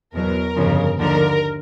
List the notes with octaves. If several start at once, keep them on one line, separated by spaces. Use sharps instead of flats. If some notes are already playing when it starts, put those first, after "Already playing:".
E2 B2 F#3 A#4
G1 F2 C#3 F3
D#2 D3 F3 A#4